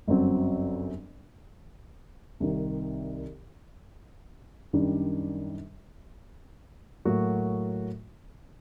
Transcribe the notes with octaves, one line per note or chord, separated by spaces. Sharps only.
G1 F#2 F#3 C4
C2 C3 D#3
F#2 D#3 G3 D4 G4
A2 F#3 A#3 F#4